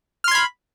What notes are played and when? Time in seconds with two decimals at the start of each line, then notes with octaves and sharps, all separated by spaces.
0.24 F6
0.28 C6
0.31 G#6
0.35 B5